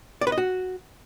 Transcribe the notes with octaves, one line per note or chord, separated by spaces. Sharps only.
D5
B4
D#5
F#4